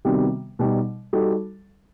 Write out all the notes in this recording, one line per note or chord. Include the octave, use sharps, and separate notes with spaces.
C3 D#3 G3 B3 F#4
B2 G3 D#4
G3 D#4 F#4 A4